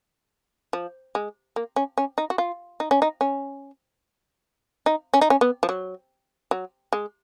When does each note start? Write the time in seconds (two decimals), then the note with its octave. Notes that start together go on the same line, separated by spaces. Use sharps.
0.73 F3
1.15 G#3
1.56 A#3
1.76 C#4
1.98 C#4
2.18 D#4
2.30 F#4
2.38 F4
2.80 D#4
2.91 C#4
3.02 D#4
3.21 C#4
4.86 D#4
5.14 C#4
5.21 D#4
5.30 C#4
5.41 B3
5.63 F3
5.69 F#3
6.51 F#3
6.93 G#3